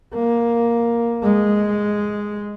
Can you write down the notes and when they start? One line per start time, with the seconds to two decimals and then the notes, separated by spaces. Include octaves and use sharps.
0.14 A#3
1.23 G#3